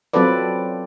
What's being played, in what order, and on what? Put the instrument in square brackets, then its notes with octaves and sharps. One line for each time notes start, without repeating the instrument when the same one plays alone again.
[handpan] F#3 C4 F4 A4 B4 D5